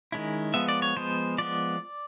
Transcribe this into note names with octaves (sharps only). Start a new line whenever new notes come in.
D#3 G#3 C#4 E4
F3 G#3 B3 E5
D5
C#5
F3 G#3 B3 C5
F3 G#3 B3 D5